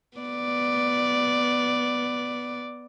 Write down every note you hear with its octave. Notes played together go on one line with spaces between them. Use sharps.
B3 D5